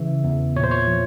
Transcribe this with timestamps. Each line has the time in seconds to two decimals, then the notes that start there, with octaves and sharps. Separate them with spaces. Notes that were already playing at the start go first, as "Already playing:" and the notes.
Already playing: C#3 E3 E5
0.24 E2
0.56 A#2 C#5
0.64 C5
0.71 C#5
0.87 F3